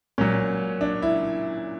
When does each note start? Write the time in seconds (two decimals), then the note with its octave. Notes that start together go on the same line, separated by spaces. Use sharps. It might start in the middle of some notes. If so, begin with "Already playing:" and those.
0.18 A#2 F#3 C#4
0.81 D4
1.02 E4